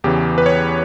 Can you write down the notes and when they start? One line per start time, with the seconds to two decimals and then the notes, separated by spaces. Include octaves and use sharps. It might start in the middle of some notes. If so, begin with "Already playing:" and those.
0.04 E2 C#3 E3 G4
0.38 B4
0.46 C#5